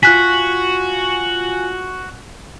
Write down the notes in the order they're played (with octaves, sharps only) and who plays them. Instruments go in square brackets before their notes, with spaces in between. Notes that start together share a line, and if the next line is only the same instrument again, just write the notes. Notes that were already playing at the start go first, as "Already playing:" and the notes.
[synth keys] F4 G#5 [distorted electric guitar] F#4 [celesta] F#6 B6